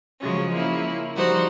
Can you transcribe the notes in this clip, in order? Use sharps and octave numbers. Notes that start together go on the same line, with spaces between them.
C#3 F3 F#3 G#3 C#4
A#3 C#4 E4
F3 G3 D#4 F#4 C5